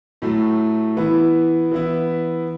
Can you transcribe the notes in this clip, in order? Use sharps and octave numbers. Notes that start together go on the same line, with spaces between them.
A2 F#3 A3
E3 B3 E4
E3 B3 E4